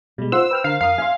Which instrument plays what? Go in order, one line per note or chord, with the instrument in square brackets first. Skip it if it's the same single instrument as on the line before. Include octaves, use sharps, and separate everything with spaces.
[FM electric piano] B2 G#3 [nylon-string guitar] G3
[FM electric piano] F4 F#5 C6 [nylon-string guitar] C5 [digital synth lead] E6
[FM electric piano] B4 G5 F6
[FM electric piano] D3 A#4 F6 [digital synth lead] F5
[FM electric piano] F2 A#4 D#6 [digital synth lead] F5
[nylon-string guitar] E5 [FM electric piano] G#5 C6